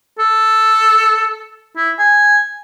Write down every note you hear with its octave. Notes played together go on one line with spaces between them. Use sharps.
A4
E4
G#5